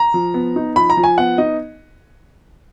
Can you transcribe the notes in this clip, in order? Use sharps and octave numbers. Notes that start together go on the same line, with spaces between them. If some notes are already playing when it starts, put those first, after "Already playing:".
Already playing: A#5
F3
B3
D#4
F3 B5
A#5
F3
G#5
B3 F#5
D#4 D#5